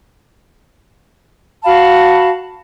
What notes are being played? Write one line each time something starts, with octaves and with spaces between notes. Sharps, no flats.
F#4 F5 A5 B5